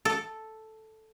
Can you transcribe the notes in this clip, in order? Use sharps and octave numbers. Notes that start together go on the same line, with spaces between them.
A4